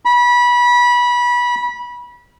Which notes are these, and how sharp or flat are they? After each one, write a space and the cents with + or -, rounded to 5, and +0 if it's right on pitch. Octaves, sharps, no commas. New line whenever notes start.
B5 -25